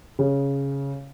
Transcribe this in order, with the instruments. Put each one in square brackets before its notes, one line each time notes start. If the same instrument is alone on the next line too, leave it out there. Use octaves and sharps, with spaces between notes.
[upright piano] C#3